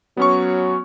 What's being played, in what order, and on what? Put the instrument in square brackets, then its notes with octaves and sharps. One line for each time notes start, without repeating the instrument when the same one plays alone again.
[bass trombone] F#3 [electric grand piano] B3 C#4 C#6